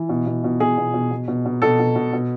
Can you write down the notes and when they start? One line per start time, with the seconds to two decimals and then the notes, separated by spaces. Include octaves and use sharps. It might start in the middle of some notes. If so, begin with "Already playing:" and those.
Already playing: E3
0.09 B2
0.26 B2
0.44 B2
0.60 B2 G#4
0.77 B2
0.94 B2
1.11 B2
1.28 B2
1.45 B2
1.62 B2 A4
1.79 B2
1.95 B2
2.13 B2